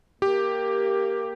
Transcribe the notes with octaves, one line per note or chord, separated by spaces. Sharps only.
A#3 G4